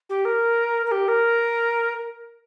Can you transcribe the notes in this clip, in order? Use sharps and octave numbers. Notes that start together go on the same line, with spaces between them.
G4
A#4
A#4
G4
A#4